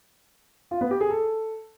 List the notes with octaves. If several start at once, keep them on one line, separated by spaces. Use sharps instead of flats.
F4
B3
G4
G#4
A4